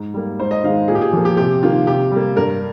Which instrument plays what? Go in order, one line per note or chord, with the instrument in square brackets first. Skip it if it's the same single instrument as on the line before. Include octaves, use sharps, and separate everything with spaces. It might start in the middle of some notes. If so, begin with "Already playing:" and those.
Already playing: [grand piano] G#2
G3 A#3
G#2 C5
D#5
D#3 F5
G#3
A#2 G#4
G4
G#4
F3 A#3
G4
C3 G4
D#3 A#3 F4
C3 G4
G3 A#3
G2 A#4